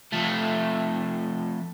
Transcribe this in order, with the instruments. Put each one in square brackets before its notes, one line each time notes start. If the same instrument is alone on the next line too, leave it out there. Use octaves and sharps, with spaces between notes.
[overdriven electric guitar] F2 A3